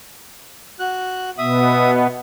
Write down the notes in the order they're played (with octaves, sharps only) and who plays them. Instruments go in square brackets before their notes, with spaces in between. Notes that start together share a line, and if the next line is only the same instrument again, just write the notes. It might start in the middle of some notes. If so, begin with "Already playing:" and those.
[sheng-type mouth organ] F#4 F#6
[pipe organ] B2 B3 [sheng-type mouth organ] E5 D#6